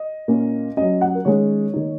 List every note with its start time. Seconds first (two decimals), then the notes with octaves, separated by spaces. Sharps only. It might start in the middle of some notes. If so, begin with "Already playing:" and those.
Already playing: D#5
0.28 A#2 A#3 C#4
0.77 F#3 C#4 D#5
1.01 F#5
1.15 A#4
1.25 D#3 G#3 C#4 C#5
1.74 D#3 A#3 D#4